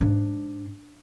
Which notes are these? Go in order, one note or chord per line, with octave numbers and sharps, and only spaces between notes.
G#2 D4